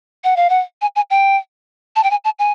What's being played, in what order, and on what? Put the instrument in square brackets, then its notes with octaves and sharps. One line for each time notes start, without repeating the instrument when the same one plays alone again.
[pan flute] F#5
F5
F#5
G#5
G#5
G5
A5
G5
G#5
A5
G#5